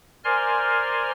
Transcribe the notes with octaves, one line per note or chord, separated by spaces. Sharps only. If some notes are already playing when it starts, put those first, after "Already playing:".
A#4 C5 D5 G#5 C6 F6